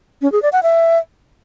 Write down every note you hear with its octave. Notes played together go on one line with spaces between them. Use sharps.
C#4
G#4
D5
F#5
E5